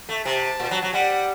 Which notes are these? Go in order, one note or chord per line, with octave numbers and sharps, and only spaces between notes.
A3
C3 A5
A#2
F#3
F#3
G3 F#5